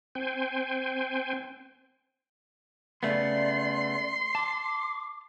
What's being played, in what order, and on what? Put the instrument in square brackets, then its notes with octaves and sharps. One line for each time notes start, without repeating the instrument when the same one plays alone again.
[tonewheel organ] C4 C5 G5 G#5
[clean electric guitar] C#3 A3 B3 [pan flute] D5 [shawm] C6
[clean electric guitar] A5 [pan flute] D6